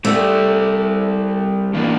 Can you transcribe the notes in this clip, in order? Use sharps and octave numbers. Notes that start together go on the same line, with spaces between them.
G3 A3 C4 G4 D5
A2 E3 A#3 D4